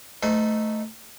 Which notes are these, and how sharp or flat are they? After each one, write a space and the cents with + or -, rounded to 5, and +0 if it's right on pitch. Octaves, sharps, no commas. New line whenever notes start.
A3 +0 D#4 +0 C5 -45